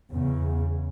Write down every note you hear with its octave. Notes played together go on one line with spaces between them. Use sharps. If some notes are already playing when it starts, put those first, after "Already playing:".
E2 C#3